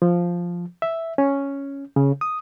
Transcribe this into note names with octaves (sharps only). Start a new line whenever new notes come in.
F3
E5
C#4
C#3
D#6